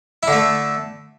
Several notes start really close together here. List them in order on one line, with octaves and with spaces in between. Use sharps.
E4 D3 A3